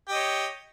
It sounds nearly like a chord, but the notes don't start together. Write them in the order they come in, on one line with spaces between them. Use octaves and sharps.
G4 D#5 C#5